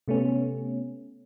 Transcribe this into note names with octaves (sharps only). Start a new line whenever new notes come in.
C3 A3 B3 C#4